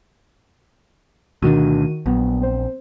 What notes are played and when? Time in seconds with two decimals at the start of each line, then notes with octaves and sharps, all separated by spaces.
1.42 D2 B2 D#3 D4 F#4 D#7
2.06 A#1 F#3 B3
2.41 C4 C5